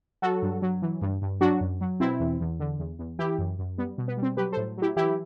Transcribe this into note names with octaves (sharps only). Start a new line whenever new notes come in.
F#3 F#4 A4
G2
F#3
E3
G2
G2
F#3 D4 F#4
F#2
F#3
B2 C4 E4
E2
E2
D3
E2
E2
E3 E4 G4
F#2
F#2
G3 B3
B2
B3
G3
C4
F#3 G4 B4
A4 C5
A2
F#3 E4 G4
E3 E4 G4